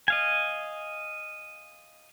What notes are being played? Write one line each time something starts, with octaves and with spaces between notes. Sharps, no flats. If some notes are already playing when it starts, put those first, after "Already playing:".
D#5 F5 G#5